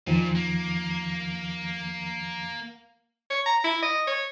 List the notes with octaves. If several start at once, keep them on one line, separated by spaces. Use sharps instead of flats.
E2 A#2 D#3 F3
A#3
C#5
A#5
E4
D#5
C#5